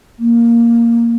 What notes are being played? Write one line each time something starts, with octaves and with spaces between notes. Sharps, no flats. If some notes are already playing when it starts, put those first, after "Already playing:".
A#3